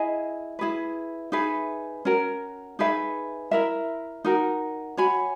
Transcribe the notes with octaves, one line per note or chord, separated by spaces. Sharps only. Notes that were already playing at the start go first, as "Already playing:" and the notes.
Already playing: E4 G#4 D#5 G#5
E4 G#4 B4
D#4 G#4 B4 E5
C#4 F#4 A#4
D#4 G#4 B4 E5
E4 A#4 E5
D#4 F#4 A#4
F#4 C#5 G#5 B5